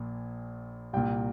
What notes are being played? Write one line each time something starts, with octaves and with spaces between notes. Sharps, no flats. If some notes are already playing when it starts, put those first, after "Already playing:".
Already playing: A#1 A#2
C2 A#2 G5